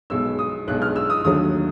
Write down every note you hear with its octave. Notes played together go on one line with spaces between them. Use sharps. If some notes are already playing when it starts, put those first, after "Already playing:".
B1 B2 G#3 E6
D#6
B1 B2 G#3 F#6
F6
E6
D#6
D#2 D3 F#3 A3 D#6